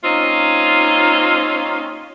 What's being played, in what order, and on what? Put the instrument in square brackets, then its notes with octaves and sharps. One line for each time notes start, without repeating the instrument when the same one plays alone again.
[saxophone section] A#3 C4 C#4 D#4 F4